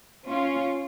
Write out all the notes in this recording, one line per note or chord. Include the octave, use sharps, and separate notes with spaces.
C#4 F4